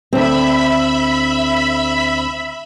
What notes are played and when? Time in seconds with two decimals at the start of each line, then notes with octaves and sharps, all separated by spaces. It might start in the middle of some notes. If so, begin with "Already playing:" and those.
0.13 D2 C4 E5 B5